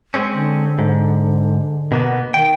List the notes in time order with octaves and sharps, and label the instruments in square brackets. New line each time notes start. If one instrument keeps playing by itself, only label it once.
[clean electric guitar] G#3 C4 C#4
[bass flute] D3
[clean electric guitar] G#2
B2 A#3 B3
[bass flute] D#3 [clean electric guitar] G5